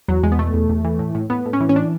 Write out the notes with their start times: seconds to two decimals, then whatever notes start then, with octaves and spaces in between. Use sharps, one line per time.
0.08 E2 F#3
0.23 E2 G#3
0.32 B3
0.39 B2 A3
0.54 E2
0.70 E2
0.85 E3
0.99 A2
1.15 A2
1.30 A2 B3
1.45 A2
1.53 C#4
1.61 E3
1.69 C#4
1.76 D4